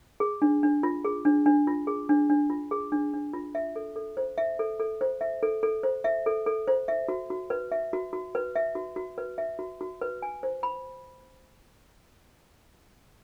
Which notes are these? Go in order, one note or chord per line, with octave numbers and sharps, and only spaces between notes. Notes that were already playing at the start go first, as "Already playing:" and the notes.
G#4
D4
D4
F4
G#4
D4
D4
F4
G#4
D4
D4
F4
G#4
D4
D4
F4
E5
A4
A4
C5
E5
A4
A4
C5
E5
A4
A4
C5
E5
A4
A4
C5
E5
F#4
F#4
B4
E5
F#4
F#4
B4
E5
F#4
F#4
B4
E5
F#4
F#4
B4
G#5
C5
B5